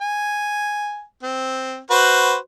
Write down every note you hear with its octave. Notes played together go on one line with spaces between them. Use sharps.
G#5
C4
F#4 B4 C5